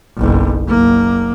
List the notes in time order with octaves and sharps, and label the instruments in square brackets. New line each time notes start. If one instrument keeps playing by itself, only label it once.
[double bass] F#1 B1
F#1 A#3